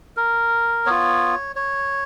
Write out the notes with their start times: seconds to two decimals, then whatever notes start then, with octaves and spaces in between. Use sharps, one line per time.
0.17 A#4
0.86 B3 F4 C#5
1.56 C#5